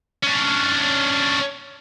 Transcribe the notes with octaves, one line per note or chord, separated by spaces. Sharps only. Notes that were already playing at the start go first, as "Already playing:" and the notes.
C#4 D4